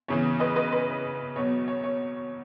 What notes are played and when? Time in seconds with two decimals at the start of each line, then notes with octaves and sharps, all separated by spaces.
0.08 E2 C#3 E3 C#5
0.40 B4 D#5
0.56 B4 D#5
0.72 B4
1.36 E2 B2 F#3 C#5
1.68 C#5
1.84 C#5